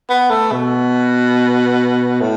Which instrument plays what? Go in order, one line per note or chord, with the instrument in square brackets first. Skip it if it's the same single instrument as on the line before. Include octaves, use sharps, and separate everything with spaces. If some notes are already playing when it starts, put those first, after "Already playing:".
[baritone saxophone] B3
A3
B2
A2